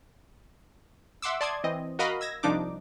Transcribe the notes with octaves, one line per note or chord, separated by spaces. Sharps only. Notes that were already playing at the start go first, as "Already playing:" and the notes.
E5 F#5 C6 D6 E6
D5 A5 C6 D6 D#6 G#6
E3 C4 D#5
F#4 A#4 D#5 F5 B5
E6 G#6 A#6
C2 F3 D4 D#4 D6